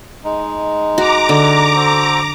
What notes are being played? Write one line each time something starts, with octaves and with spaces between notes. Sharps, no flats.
G#3 D#4
F#4 A#5 D6
D3
F#4 A4 C5